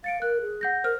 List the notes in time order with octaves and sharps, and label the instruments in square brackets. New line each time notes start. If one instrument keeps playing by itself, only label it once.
[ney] F5 [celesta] A6 C#7 D7
[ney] A#4 [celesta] F#6
[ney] G#4
[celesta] F#5 G6 A#6
[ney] A#4 [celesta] C5 F6